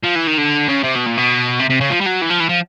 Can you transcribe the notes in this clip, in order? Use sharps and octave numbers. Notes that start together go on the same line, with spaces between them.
F3
E3
D#3
D3
C#3
C3
B2
A#2
B2
C3
C3
C#3
F3
G3
F#3
E3
F3
E3
F3